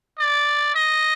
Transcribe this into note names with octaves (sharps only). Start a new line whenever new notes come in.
D5
D#5